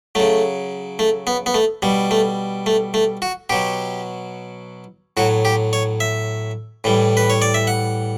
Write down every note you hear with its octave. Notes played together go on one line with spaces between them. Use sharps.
C#3 F#3 A3
A3
B3
B3
A3
B2 G3
A3
A3
A3
F#4
B2 F#3 G4
A2 F#3 F#4
G4
C#5
E5
A2 E3 G3
B4
C#5
D5
E5
F#5